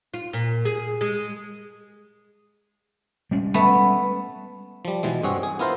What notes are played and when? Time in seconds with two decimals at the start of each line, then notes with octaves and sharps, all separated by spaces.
0.14 F4
0.33 A#2
0.65 G#4
1.01 G#3
3.31 G3 G#3 C#4
3.54 A3 B3
4.85 F3 G3
5.03 B2 E3 G#3
5.23 G2 C4 G#4 C#5 F#5
5.43 G#4
5.59 B3 E4 F4 A#4 C5